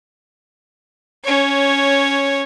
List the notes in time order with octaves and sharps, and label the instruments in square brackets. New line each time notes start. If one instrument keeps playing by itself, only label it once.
[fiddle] C#4 C#5